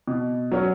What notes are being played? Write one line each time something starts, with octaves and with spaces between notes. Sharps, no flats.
B2
F#3 C#4